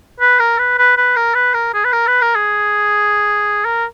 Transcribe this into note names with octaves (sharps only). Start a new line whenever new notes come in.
B4
A#4
B4
B4
B4
A#4
B4
A#4
G#4
B4
A#4
B4
A#4
G#4
A#4